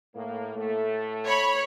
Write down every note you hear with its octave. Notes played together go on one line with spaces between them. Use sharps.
A2 A#3
A2 A3
C#5 B5